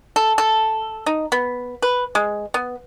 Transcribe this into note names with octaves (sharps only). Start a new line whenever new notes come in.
A4
A4
D#4
B3
B4
G#3
B3